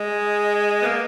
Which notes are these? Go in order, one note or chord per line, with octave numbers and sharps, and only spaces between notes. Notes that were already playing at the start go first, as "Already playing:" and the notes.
Already playing: G#3
B3
A#3